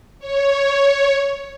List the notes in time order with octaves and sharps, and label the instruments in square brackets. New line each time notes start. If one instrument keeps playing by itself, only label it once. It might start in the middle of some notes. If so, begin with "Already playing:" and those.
[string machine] C#5